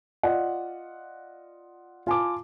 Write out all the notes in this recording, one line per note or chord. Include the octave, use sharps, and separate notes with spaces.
F4 D5 D#5 F#5
F4 G#5 A5 D6